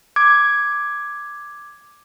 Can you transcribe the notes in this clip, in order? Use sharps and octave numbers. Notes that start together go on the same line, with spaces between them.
D6 G#6